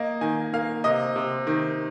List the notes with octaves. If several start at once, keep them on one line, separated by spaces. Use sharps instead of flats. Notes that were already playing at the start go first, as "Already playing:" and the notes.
Already playing: A#3 D#5
D#3 G#5
A#3 F5
C3 D#5
C3
D#3